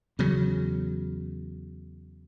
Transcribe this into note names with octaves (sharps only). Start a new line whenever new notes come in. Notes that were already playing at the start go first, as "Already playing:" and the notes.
E2 C#3 F#3